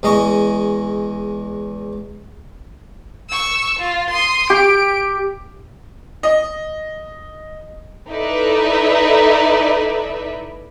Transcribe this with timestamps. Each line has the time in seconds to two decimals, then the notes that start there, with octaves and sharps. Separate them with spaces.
0.03 E2 G#3 D#5 C#6
3.29 C#6 E6
3.79 F4
4.11 C6 D#6
4.50 G4 D7
6.23 D#5
8.11 D#4 E4 A4 B4 D5 E5